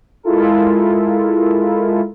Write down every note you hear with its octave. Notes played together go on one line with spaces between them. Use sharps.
G#3 E4 F4 A4 A#4